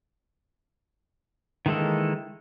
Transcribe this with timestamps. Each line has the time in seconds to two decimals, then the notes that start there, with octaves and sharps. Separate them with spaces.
1.66 D#3 E3 G#3 A#3 A4